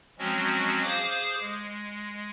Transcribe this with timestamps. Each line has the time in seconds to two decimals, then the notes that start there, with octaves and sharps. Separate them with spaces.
0.19 F3 F#3 G#3 C4 C#4 F#4
0.83 G#4 C5 F5 D6 D#6
1.40 G#3